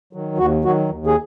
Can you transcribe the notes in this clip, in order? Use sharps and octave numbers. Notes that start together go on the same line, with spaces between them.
D#3 F#3
D#2 F#4
D#3 F#3 F#4
D#2
G#4